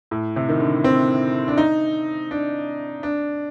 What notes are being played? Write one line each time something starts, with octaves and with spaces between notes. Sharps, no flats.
A2
C3
D#3
D3
C4
D4
D#4
D4
D4